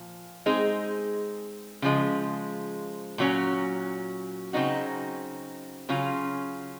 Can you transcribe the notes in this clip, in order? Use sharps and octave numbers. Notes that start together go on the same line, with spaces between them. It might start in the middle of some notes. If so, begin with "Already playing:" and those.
Already playing: A#2 F3
G#3 C4 D#4 G#4
C#3 F3 G#3
A#2 F#3 C#4
C#3 F#3 C4 D#4 F#4
C#3 F#3 C#4 F4